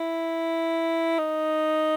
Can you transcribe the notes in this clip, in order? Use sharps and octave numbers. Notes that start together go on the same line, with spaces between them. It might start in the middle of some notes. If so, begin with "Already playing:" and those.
Already playing: E4
D#4